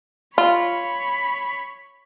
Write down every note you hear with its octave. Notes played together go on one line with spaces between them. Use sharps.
F4 C#5 B5